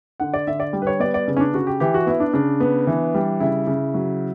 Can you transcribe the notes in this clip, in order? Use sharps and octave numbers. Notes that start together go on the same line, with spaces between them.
D3 F#5
D5
D3 E5
D5
G3
B4
C#5
B3 D5
D5
C#3
C#4
D4
C#3 F#4
G4
E3 G4
F#4
B3 E4
D4
C#3 D4
B3
E3
G3
C#3 E4
C#3
F#3